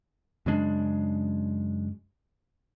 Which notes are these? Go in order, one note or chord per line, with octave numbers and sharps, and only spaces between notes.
F#2 C#3 G#3 D4